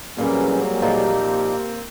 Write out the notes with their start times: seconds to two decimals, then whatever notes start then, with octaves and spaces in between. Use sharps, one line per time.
0.18 A#2 E3 F#3 G3 A#3 C4 C#4 G#4
0.82 A#2 F3 D#4 G4